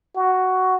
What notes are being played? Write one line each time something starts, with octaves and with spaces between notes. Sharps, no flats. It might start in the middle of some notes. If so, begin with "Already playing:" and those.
F#4